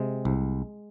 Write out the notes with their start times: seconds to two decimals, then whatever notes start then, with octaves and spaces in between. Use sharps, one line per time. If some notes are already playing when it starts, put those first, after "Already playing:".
Already playing: C3 G#3
0.25 C2